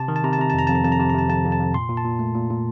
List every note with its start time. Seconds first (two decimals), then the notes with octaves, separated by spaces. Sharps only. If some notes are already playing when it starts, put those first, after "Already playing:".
Already playing: C3 A5
0.08 D#3
0.16 A5
0.24 C3 A#5
0.33 A5
0.39 C3 A#5
0.50 A5
0.54 F2 A#5
0.67 F2 A5
0.75 A#5
0.83 F2 A5
0.92 A#5
0.99 C3 A5
1.09 A#5
1.14 C3 A5
1.29 F2 A5
1.44 F2
1.52 A5
1.60 F2
1.74 A#2 C6
1.89 A#2
1.97 A5
2.05 A#2
2.19 A3
2.35 A#2
2.50 A#2